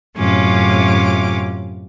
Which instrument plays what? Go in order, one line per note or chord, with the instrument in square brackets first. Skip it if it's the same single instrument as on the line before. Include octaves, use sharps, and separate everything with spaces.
[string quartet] F#2 A2 C3 C#4 F4 D6